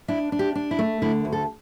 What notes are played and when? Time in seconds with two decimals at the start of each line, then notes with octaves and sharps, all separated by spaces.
0.08 D4 E4
0.32 D4
0.39 G4
0.55 D4
0.71 E4
0.79 A3
1.02 D3 E4
1.25 D2
1.32 A4